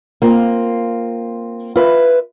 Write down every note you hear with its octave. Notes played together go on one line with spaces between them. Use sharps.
A#3 C4 F4
F4 B4 E5